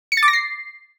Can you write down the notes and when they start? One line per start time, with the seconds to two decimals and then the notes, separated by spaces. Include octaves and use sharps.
0.12 C#7
0.17 A6
0.23 D6
0.28 A#6
0.33 C7